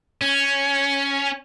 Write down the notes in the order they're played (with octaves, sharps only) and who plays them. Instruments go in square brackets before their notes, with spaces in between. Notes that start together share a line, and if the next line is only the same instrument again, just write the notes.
[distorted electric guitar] C#4